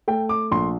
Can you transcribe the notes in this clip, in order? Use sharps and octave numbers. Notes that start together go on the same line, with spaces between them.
A3 G5
D6
A#1 C6